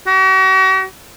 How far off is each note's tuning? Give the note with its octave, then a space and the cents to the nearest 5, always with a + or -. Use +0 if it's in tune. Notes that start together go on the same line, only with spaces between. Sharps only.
F#4 +45